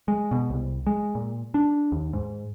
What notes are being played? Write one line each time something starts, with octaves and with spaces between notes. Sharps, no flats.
G#3
B2
C2
G#3
A#2
D4
D#2
G#2